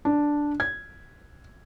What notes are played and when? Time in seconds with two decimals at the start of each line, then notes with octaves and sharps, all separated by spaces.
0.05 D4
0.60 G#6